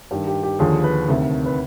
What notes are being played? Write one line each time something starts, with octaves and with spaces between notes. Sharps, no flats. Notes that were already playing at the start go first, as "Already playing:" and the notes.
G2 D#3 G4
G4
G4
D#2 D3 F3 G#4
B4
D2 C3 D#3
B4